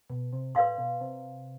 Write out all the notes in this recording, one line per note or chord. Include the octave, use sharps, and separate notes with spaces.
B2
C3
A2 B4 D5 F5 C6
B2
C3